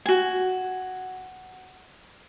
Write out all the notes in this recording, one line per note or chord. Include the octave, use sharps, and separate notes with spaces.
F#4 G#5